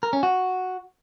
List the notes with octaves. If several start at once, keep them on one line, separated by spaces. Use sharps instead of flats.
A#4
C#4
F#4